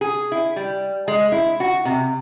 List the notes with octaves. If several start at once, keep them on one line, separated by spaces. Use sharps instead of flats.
G#4
E4
G3
G#3
E4
F#4
C3